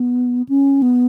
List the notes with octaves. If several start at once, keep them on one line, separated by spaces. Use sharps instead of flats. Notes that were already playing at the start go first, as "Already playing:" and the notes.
Already playing: B3
C#4
B3